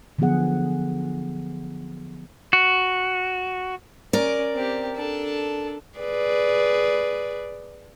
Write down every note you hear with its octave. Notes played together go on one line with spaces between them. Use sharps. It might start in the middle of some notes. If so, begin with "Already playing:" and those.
D3 F3 F#3 B3 G#4 F#5
F#4
C#4 A#4 D5
C4 G4
D4 A4
G#4 B4 D5